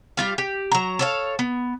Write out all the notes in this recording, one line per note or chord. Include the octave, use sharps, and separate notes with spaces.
G3 F4 F5
G4
F#3 A#5
A4 C#5 F5
B3